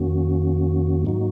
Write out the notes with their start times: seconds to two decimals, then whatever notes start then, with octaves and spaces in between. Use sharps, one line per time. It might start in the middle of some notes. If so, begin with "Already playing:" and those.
Already playing: F2 D#3 A#3 C#4 F#4
1.05 G#2 F#3 A#3 D#4 F#4